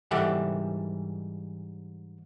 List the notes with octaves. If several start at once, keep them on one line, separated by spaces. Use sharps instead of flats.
G#2 E3 G3 G4 A4 F#5